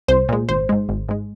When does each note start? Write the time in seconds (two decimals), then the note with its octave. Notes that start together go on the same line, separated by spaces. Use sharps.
0.08 C2 C5
0.29 A#2 G#3
0.49 G#1 C5
0.69 G#2 G#3
0.89 G#1
1.09 G#2 G#3